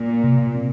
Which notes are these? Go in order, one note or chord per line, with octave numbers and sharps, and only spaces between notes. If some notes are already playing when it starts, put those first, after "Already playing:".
Already playing: A#2
C3
C4